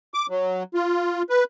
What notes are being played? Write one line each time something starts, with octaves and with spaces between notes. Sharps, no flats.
D6
F#3
F4
B4